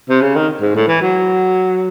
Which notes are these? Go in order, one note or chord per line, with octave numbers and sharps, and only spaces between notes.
C3
C#3
D#3
G#2
A2
E3
F#3